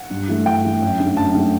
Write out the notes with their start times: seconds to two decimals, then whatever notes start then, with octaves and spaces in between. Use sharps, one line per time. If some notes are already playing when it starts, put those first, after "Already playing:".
Already playing: F#5
0.10 G2
0.28 E3 A3
0.46 G2 G5
0.64 E3 A3
0.81 F#2
1.00 D3 A3
1.17 F#2 A5
1.35 D3 A3